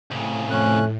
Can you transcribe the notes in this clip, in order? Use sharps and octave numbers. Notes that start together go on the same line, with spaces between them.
C2 A2 C#3
F2 A3 C#4 F#6